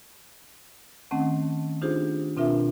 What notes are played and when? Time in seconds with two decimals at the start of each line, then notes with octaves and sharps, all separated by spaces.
1.11 D#3 A3 C4 C#4 F#5 A5
1.82 D4 D#4 F4 G4 G#4 C5
2.37 B2 C4 D4 F4 A#4 E5